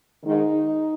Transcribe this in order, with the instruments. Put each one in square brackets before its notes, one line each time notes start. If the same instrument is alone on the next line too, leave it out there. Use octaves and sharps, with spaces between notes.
[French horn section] G#2 D#3 D#4